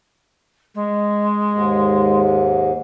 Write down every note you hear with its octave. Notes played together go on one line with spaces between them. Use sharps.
G#3
D#2 G#2